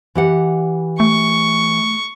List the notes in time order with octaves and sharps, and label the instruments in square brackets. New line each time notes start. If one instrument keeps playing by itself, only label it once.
[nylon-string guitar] E3 G4 F#5
[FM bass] A3 [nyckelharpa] C#6